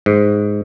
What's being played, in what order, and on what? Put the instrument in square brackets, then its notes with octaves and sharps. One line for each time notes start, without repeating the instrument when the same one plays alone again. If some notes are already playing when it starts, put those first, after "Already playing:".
[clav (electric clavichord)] G#2